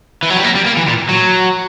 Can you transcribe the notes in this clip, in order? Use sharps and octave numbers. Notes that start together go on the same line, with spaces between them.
E3
F#3
G3
A#3
G3
A#3
E3
A#2
F#3